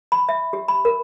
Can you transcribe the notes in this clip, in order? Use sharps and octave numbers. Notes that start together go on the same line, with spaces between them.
B5
E5
G4
B5
A#4